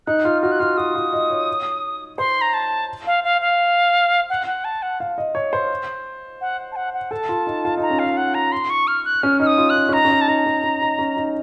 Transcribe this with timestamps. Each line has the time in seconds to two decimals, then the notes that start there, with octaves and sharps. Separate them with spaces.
0.07 D#4 F#6
0.25 F4 F6
0.42 F#4 F6
0.52 F#6
0.59 F4 F6
0.77 F#4 D#6
0.95 F4
1.13 D#5
1.30 C#5
2.18 C5 C6
2.41 A#5
2.54 A5
3.07 F5
3.24 F5
3.41 F5
4.30 F#5
4.47 F#5
4.65 A5
4.83 F#5
5.00 F5
5.18 D#5
5.35 C#5
5.53 C5
6.41 F#5
6.72 A5
6.76 F#5
6.94 F#5
7.11 A4 A5
7.29 F4
7.47 D#4
7.65 F4
7.77 D#4 A#5
7.90 C#4
7.99 D#4 F5
8.17 F#5
8.35 A#5
8.52 C6
8.70 C#6
8.87 F6
9.05 F#6
9.23 C#4 F6
9.40 D#4 F6
9.47 D#6
9.58 F4
9.70 F#6
9.75 D#4
9.89 C#4
9.93 D#4 A#5
10.05 C#4
10.11 D#4
10.21 A5
10.28 D#4 A#5
10.46 C#4
10.63 C#4
10.81 D#4
10.99 C#4
11.17 D#4